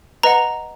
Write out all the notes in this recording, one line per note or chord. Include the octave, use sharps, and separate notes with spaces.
B4 D#5 F#5 A#5